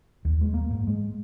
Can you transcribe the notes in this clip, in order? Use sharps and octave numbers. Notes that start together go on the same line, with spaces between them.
D#2
G#3
A#3
G#2
G#3